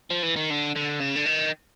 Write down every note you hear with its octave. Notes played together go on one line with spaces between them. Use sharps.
F3
E3
D#3
D3
D3
C#3
D3
D#3